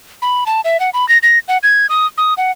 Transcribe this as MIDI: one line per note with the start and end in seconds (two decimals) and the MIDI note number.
0.22 0.44 83
0.46 0.61 81
0.65 0.80 76
0.80 0.90 78
0.94 1.08 83
1.09 1.18 94
1.23 1.39 94
1.48 1.58 78
1.63 1.87 92
1.89 2.07 87
2.18 2.34 87
2.37 2.51 78